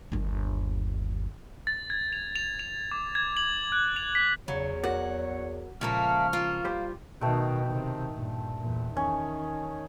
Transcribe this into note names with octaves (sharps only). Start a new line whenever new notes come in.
G1 D#2
A6
G#6
F7
F7
F7
D6
G#6
F#7
F#6
F7
B6
E2 C#3 F#3 C#5
F#4 A#4 D5 F#5
C#2 A#2 F3 A3 A#3 C#6 F6
A#3 F4
G3 G4 C5
B2 D#3 A3 G5
C3 D#3
G2 A#2
E2 A#2
D#3 C#4